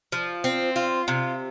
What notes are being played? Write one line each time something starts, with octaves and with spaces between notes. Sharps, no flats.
F3
C4
F4
C3